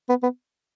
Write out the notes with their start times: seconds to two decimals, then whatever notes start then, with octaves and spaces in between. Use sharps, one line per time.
0.09 B3
0.23 B3